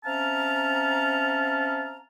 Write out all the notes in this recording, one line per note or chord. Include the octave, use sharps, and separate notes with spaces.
C4 C#4 E5 F5 A5 A#5